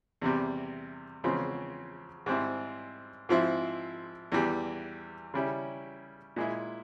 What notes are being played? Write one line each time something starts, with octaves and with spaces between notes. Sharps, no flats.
E2 C3 G3
E2 C#3 F3 G#3 C4
G#2 G3 C4 E4
G#2 F3 C4 E4
E2 E3 G3
C#3 G3 C#4 E4
A#2 G#3 E4